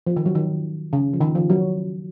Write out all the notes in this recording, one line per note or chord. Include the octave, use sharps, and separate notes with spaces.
F3
D#3
F#3
D#3
C#3
F3
D#3
F3
F#3